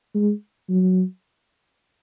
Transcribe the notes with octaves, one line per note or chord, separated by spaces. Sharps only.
G#3
F#3